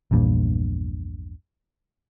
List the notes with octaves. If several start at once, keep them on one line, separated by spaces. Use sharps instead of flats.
A#1 E2 G2 A#2